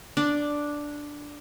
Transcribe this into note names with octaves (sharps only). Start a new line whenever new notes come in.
D4